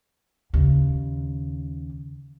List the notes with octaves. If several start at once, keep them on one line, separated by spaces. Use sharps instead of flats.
D#2 C#3